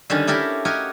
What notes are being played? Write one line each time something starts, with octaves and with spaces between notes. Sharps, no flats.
D3 D#3 G3 C#4
E4 G4 A4 A#4 B5
F#4 G4 A#4 C#5 D#5